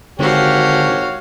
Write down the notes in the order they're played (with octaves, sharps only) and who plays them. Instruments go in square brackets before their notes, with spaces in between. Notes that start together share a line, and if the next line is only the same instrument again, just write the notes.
[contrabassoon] G#1 [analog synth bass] D3 [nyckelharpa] F#4 F5 [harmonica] G4 C#5